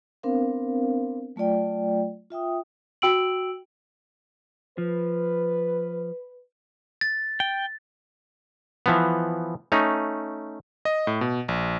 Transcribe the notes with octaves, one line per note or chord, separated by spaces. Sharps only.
B3 C4 D4 A#4 C5 F5
F#3 A3 F4 D5 G5
F4 E5 G5 D#6
F#4 G5 E6 D7 F#7
F3 B4
A6
G5
E3 F3 B3
A3 C#4 D#4
D#5
A2
B2
A#1